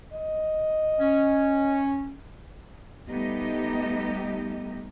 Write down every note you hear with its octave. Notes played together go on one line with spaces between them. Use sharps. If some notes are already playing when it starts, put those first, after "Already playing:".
D#5
C#4
G3 A3 B3 D#4 G4 D#5